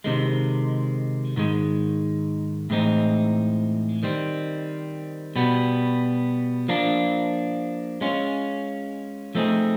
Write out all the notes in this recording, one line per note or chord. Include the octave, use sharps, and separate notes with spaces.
C3 D#3 G#3
G#2 D#3 G#3
A2 E3 G#3 C4 D#4
D#3 G3 C4
B2 G3 B3
F3 A#3 D4
G#3 C#4 F4
F3 A3 C4 D#4 G#4